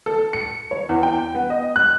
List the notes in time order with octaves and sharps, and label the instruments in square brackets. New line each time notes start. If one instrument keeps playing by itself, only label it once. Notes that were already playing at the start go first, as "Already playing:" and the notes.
[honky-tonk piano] A4
C#7
C#5
E2
G5
B3
D#5
F#6